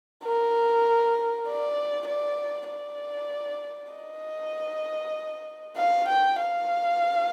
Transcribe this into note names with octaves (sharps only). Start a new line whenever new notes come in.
A#4
D5
D5
D5
D#5
F5
G5
F5